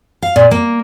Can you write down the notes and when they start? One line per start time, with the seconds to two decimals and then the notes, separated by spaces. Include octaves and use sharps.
0.22 F5
0.36 A#2
0.51 A#3